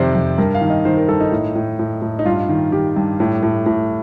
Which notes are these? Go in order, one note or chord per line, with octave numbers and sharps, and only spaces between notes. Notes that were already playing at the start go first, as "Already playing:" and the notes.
Already playing: F2 C3 D#3 C5 D5
F2
G2 A#4
F5
D#3
D#5
D#3 C5
A#4
G2 A4
D#4
A2
A2
A2
A2
D#4
G2 F4
D#3
D#3 G4
G2
A2
A2
A2